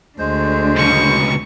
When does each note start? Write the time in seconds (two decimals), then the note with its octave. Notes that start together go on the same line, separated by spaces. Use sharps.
0.19 D2 D3 G#3 C5
0.76 C#2 B2 C#6